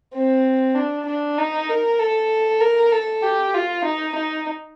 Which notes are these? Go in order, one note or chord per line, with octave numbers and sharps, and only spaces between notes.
C4
D4
D4
D#4
A#4
A4
A#4
A4
G4
F4
D#4
D#4